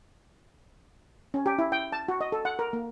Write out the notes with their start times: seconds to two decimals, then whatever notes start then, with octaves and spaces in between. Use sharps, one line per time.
1.34 C#4
1.46 G4
1.59 E4
1.72 G5
1.92 A5
2.08 F#4
2.21 D#5
2.32 A4
2.45 F#5
2.59 A#4
2.73 A#3